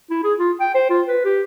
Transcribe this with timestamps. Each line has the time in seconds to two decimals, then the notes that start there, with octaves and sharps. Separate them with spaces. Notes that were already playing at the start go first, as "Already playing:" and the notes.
0.11 E4
0.24 G#4
0.38 F4
0.60 G5
0.75 C5
0.90 F4
1.08 B4
1.25 G4